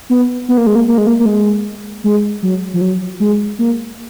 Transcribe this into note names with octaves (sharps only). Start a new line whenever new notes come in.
B3
B3
A#3
G#3
A#3
A#3
G#3
A#3
A#3
G#3
G#3
F#3
F3
F#3
G#3
A#3